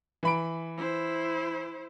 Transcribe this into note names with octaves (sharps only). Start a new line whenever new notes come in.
E3 B5 D7
E4 C5